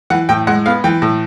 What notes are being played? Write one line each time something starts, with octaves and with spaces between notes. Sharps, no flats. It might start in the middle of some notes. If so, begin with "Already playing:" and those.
E3 F#5
A2 G5
G#3 F#5
B3 F5
E3 G5
A2